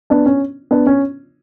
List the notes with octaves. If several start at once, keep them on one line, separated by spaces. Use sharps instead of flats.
B3 D4
C#4
B3 D4
C#4